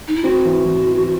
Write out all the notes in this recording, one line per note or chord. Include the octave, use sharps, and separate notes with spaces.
D#4
E4
C4 F#4
E3
E3
E3